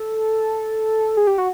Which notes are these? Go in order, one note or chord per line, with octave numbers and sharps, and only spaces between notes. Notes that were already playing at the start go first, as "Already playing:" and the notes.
Already playing: A4
G#4
G4
F#4